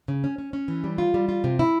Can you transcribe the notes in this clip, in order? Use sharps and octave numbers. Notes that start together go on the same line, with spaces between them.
C#3
C#4
C#4
C#4
E3
G3
F4
G3
F4
C3
E4